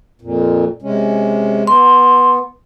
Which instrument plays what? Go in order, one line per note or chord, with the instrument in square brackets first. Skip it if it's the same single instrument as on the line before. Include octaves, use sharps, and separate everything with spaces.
[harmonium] F2 A#2
C3 G#3 C#4
[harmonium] B3 [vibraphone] C6